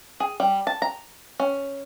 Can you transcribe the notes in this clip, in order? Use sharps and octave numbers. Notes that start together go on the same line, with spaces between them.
G#4
G3
A5
A#5
C#4